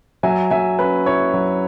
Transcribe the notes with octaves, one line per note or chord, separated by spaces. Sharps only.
F#3 E5 G#5
F#3 E5 G#5
C#4 B4
E4 C#5
F#3